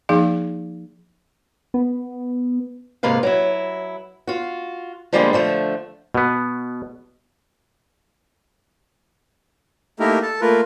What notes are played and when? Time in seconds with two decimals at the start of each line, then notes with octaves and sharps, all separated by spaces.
0.09 F3 A#3 D#4 G#4 F5
1.74 B3
3.03 G#2 C3 A#3 B4 F5
3.23 F#3 E4
4.27 F4 F#4
5.13 D3 F3 G3 G#3 A#3 D4
5.33 D3 F3 A3
6.14 B2 B3
10.00 A3 A#3 D#4 E4 G4 A#4
10.23 A4 A5
10.41 A3 A#3 F4 A#4 B4